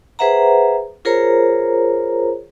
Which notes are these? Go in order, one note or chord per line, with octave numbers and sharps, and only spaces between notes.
G#4 B4 C5 E5 F#5 A#5
F4 G#4 A#4 C5 C#5 A#5